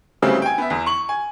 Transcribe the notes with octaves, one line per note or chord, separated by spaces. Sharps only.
C#3 E3 F#3 G3 A3 C4
G5 G#5
B3 E5
E2
C#6 F#7
G#5